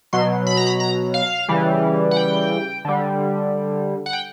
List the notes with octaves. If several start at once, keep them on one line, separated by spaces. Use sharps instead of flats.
B2 F#3 C6
B5
A#5
B5
A#5
F5
C#3 E3 G3
F#5
G5
D3 G3
F#5
G5